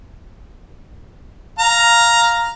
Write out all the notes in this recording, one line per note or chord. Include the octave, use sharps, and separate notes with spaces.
F5 A#5